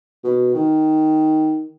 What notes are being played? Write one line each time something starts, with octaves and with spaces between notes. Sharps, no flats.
B2
D#3